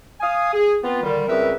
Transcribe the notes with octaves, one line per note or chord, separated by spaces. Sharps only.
F5 G#5 D#6
G#4
B3 C4 F4
A#2 D3 D#3 G3
C#2 G3 C4 A#4 B4 E5